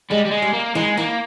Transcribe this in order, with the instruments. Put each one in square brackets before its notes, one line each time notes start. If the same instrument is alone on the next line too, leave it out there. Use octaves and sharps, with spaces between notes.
[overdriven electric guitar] G3 [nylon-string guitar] G#3
[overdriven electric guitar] G3
G#3
[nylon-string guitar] G3
[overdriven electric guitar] A#3
[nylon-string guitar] E3 [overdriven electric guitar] G#3
[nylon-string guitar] E3 [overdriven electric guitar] A#3